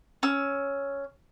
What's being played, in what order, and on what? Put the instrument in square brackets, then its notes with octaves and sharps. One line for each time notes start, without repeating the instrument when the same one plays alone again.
[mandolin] C#4 E6